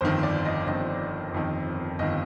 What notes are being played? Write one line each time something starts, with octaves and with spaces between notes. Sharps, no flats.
G1 F2 D#3 C5
D5
D#5
G1 F2 D#3 D#5
G1 F2 D#3
G1 D#3 D#5